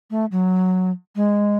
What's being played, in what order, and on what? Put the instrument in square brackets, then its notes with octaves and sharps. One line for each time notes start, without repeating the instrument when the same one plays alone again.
[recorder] A3
F#3
G#3